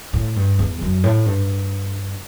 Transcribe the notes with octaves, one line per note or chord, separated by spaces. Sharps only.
A2
G2
E2
F#2
A2
G2